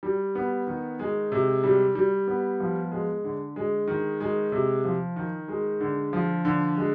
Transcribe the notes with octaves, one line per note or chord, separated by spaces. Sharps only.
G3
B3
D#3
G#3
C3
G3
G3
B3
F3
G#3
D3
G#3
D#3
G#3
C3
F3
D#3
G#3
D3
F3
D3
G#3